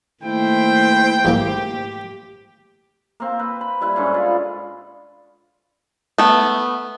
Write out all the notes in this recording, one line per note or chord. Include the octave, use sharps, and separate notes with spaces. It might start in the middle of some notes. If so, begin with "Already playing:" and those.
D#3 A3 A#3 E4 C5 G5
G#2 E3 A#3 G4
A#3 C4
B4
B5
G3 E4 B4
G#2 D3 C#4
F4
A3 B3